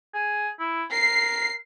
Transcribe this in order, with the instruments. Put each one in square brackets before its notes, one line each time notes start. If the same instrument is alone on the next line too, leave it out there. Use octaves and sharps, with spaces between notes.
[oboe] G#4
E4
[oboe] A#4 [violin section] C7